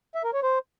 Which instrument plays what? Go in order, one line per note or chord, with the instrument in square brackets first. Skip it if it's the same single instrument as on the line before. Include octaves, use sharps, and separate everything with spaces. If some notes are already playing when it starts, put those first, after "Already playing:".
[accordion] E5
A#4
C#5
C5